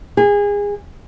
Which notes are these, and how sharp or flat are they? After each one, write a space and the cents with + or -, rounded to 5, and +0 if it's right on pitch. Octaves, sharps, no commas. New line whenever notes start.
G#4 -25